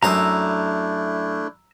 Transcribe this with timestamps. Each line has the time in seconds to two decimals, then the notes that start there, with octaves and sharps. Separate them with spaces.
0.03 F#2 A3 D4 E4 C5 A#5 D#6 E6